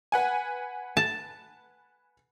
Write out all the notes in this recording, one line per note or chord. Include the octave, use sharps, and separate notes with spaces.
B4 F#5 G#5
A5